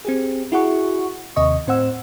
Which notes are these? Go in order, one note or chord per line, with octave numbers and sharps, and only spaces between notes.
C4 G4 G#4
E4 F#4 G#4 F#5 C#6
D#2 C3 D#5 C#6
A2 C4 C5 F#5 E6